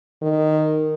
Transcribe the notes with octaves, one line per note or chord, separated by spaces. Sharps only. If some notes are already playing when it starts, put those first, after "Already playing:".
D#3